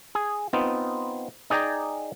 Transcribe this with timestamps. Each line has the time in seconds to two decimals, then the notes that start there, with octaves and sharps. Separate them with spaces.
0.15 G#4
0.53 B3 C4 D#4 F4
1.50 D#4 G#4 D5 G5 G#5 A#5